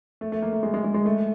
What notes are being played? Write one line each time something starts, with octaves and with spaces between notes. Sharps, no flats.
A3
A3
A#3
A3
G#3
G#3
G#3
G#3
A3